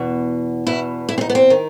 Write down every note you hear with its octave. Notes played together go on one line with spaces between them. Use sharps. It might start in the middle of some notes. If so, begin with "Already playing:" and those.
Already playing: E2 B2
E2 B2 E4
E4
C4
D#4
B3
C4
D#3